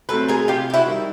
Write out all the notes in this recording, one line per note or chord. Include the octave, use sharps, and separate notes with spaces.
F#3 A3 C4 A4 B4
G#4 A#4
C3 F4 G4
G4
E4 F#4
D#3 G3